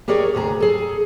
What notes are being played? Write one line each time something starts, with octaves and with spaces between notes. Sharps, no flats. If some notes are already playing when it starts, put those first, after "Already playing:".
G4 G#4 A#4 C#5 D5
D2 C3 G#4 A#5
G#4 A4